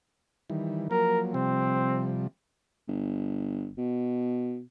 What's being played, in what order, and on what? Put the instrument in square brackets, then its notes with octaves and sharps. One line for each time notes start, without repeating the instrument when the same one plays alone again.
[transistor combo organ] D#3 E3 G3
[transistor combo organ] F3 F#3 A#3 [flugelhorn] A#4
[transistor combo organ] C3 F3 G3 [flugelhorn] C4
[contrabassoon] G1
B2